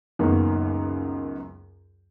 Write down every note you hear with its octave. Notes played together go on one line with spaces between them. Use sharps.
C#2 F#2 D#3 A#3 B3